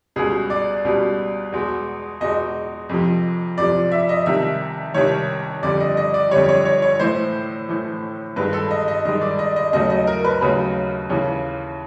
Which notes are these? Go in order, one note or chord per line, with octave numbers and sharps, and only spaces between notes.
C#2 B2 G3 G#4
D5
C#2 B2 G3
E2 B2 G#3
E2 B2 G#3 D#5
F2 C3 F3
F2 C3 F3 D5
E5
D#5
C2 C3 D#3 E5
C2 C3 D#3 C#5
F2 D3 G3 D5
D#5
D#5
D5
F2 D3 G3 C#5
C#5
C#5
C#5
A2 E3 A3 C5
A2 E3 A3
G2 D#3 G#3 B4
A4
D#5
D#5
G2 D#3 G#3 D#5
D5
D#5
D#5
D#2 C#3 F#3 A3 D#5
D#5
A#4
B4
D#2 C#3 F#3 A3 B4
D#2 C#3 E3